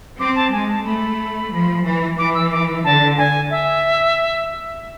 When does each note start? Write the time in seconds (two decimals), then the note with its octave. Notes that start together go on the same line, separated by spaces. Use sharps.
0.20 C4 D6
0.36 A5
0.52 G#3 G#5
0.69 A5
0.86 A3 B5
1.52 F3
1.85 E3
2.18 E3 D6
2.35 E6
2.52 D6
2.84 D3 A5
3.18 G#5
3.51 E5